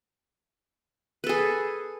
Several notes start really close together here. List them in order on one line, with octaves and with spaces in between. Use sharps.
B4 A4 G#4